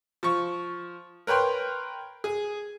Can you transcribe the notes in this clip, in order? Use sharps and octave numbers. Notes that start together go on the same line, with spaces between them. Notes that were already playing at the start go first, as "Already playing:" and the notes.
F3 C#6
A#4 B4 C#5 G5 C6
G#4